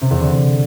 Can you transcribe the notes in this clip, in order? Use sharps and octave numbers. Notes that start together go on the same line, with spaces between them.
C3
E2
D3